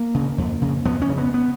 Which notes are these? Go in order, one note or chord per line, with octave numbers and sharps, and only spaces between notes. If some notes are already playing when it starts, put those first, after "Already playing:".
Already playing: A#3
C#3
F2
C#3
F2 B3
C#4
C#3
B3
B3